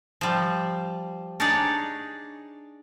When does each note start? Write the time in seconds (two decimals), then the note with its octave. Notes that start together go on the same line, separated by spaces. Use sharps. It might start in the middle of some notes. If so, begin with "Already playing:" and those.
0.21 F3 G3
1.40 D4 D#4 G#4 C#5 D5